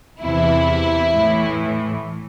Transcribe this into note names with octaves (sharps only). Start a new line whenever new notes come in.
E2 C3 E3 E4
A2 E3